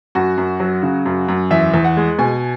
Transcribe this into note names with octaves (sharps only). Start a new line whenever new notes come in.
F#2 F#4
F#2
F#3
C#3
F#2
F#2
E2 E5
E2
F#5
G#3
B2 G#5